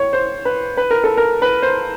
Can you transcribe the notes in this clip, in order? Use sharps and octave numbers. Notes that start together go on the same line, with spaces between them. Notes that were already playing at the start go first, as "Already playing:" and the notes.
Already playing: C#5
C5
B4
B4
A#4
A4
A#4
B4
C5